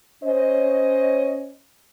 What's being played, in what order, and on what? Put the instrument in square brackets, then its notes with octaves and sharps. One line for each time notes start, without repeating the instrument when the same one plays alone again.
[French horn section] C#4 C5 C#5 D#5